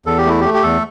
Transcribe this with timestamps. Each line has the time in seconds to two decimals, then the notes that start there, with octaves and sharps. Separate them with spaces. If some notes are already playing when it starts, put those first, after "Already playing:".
0.06 E2 A4
0.18 G4
0.26 A3 E4
0.40 A3 G4
0.54 G4
0.63 E2 A4